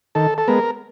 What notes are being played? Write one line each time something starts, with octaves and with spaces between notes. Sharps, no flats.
D#3 A4
A4
G#3 B3 A#4